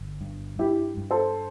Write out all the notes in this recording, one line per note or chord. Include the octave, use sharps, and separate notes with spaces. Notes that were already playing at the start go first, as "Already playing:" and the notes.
Already playing: G1
G2
G2 E4 G4
G2
A4 C5